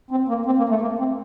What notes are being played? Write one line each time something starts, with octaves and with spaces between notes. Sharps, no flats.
C4
A#3
C4
A#3
A3
A#3
C4